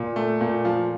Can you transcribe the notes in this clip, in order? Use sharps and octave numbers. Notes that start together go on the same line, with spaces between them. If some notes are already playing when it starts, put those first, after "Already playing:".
Already playing: A#2
A3
A#2
F3